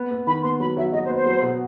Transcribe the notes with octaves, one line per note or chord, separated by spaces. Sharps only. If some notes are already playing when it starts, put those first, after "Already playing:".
Already playing: B3
B3
D#3 B5
B3 C6
F#3 B5
F#3 E5
F#3 D#5
C5
B3
C5
F#3
B2